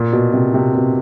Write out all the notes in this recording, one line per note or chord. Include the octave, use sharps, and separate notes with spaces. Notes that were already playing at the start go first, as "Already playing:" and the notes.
Already playing: A#2
B2
C3
C3
B2